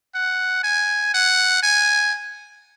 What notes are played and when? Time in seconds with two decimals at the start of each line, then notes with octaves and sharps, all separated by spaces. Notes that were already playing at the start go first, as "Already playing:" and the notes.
0.15 F#5
0.64 G#5
1.14 F#5
1.63 G#5